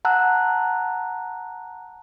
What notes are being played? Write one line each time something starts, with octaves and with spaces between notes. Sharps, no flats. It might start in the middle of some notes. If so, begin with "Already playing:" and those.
F#5 A5 A#5 E6 F#6